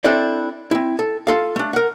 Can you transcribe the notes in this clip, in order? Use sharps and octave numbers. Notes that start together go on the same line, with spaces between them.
C4 D4 E4 A4 C5 D5
C4 E4
A4
F4 A4 F5
A3 D4
A#4 F#5